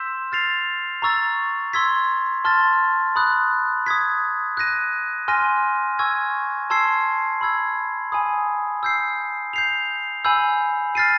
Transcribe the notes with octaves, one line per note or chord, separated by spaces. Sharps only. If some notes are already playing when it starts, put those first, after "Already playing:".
Already playing: C6 E6 G6 B6 E7
F6 A6 C7 F7
A#5 C#6 E6 A6
C6 E6 G#6 B6
A5 C6 F6 A6
B5 D#6 F#6
D#6 G#6 B6
F#6 A#6 D#7
G#5 C6 F6 A#6 D#7
G#5 C#6 E6 G#6
A5 C6 E6 G#6 C7
B5 E6 G#6
G#5 B5 D#6
E6 G6 C7
G6 C7 F7
G#5 B5 E6 G6
F6 A6 C7 D#7